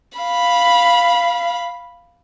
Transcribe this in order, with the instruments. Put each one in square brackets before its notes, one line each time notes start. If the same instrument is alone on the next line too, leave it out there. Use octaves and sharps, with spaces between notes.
[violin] F5 B5